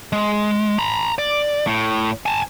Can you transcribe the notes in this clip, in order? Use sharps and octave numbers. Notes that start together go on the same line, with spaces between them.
G#3
A#5 B5
D5
A2
G#5 A5